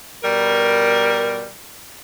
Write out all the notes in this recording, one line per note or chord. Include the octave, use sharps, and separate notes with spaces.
B2 G3 A#4